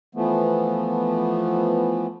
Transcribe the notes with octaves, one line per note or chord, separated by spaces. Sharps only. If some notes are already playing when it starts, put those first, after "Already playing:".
E3 F3 A3 B3